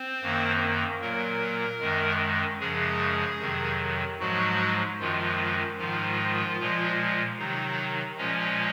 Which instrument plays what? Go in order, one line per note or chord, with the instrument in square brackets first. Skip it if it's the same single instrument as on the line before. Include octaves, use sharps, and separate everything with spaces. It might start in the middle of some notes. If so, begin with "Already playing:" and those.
Already playing: [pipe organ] C4 C5
F#2 D#3 A#3
A#2 F#3 A#3 A#4
F#2 D#3 G#3
F#2 C#3 F3 G#3 G#4
F2 C3 D#3 F#3
G#2 F3 F#3 G#3 F#4
F#2 D#3 F3 G#3 F4
G#2 D#3 F3 G#3 F4
A#2 F3 G#3
C3 D#3 F#3 D#4
A#2 F3 G#3 C#4